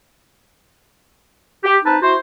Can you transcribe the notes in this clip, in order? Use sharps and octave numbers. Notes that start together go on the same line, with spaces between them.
G4
C4 D#4 B4 A5
E4 F#4 C5